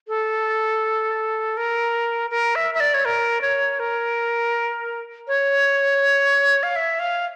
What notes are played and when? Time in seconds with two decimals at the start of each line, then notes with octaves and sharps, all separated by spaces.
0.08 A4
1.57 A#4
2.31 A#4
2.55 E5
2.75 E5
2.80 D5
2.94 C#5
3.05 A#4
3.41 C#5
3.80 A#4
5.28 C#5
6.63 F5
6.76 E5
6.99 F5